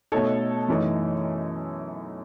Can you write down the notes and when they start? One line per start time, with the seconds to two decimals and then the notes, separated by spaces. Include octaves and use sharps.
0.12 B2 A3 D#4 A4 C#5
0.68 F#2 E3 A3 D#4